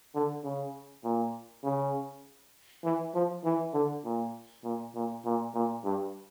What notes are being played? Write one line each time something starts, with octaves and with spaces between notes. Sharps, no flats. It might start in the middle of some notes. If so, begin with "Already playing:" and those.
D3
C#3
A#2
C#3
E3
F3
E3
D3
A#2
A#2
A#2
A#2
A#2
G2